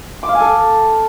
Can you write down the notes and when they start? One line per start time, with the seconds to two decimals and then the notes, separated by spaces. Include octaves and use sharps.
0.23 D6
0.29 F5
0.35 G#5
0.40 A4